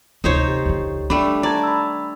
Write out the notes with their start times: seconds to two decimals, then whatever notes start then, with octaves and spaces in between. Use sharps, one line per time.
0.24 D2 C3 D#4 C5 C#5
0.48 G4
0.66 C#2 D3
1.10 D#3 G3 A3 D4 B5
1.43 D5 A5 A#5 G#6
1.63 B5 E6